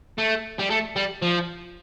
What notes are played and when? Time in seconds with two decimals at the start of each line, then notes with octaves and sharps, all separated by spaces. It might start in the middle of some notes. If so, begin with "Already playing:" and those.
0.18 A3
0.59 G3
0.70 A3
0.96 G3
1.22 F3